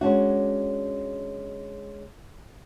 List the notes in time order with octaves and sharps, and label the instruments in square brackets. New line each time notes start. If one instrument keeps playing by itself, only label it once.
[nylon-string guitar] G#3 C#4 D4 F#4